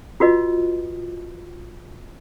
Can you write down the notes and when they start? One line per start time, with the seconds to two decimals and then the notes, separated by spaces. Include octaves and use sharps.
0.20 F4 F#4 B4 D#5